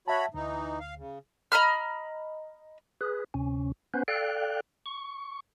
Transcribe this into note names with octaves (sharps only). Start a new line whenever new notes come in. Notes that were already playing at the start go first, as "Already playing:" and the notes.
F#4 C#5 E5 A5 B5
D2 E3 D#4
F5
C#3
D#5 A#5 B5 F6
G#4 B4
D2 C3 C#4
B3 C#4 B4 C5
A4 D5 F5 G5 F#6
C#6